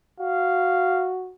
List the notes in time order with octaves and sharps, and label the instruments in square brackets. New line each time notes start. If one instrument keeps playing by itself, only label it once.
[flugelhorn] F#4 [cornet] F5